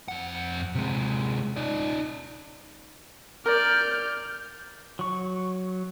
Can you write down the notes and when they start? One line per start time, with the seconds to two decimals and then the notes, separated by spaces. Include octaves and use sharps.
0.08 F2 F#5
0.75 C3 G#3
1.56 D#4 D5
3.46 A#4 D5 F6 G6
4.99 F#3 C#6